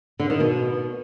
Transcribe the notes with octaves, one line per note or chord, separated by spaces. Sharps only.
D3
D#3
B2